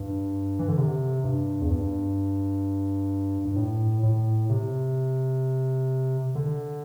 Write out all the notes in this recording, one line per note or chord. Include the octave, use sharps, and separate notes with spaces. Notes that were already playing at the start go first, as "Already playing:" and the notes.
Already playing: G2
E3
D3
C3
G2
E2
G2
G2
A2
A2
C3
D3